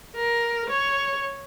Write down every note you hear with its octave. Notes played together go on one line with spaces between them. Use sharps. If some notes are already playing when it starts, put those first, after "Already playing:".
A#4
C#5